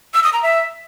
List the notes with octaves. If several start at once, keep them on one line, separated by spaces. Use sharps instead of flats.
E6
D#6
A#5
E5